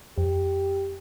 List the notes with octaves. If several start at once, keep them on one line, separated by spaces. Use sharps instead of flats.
F2 G4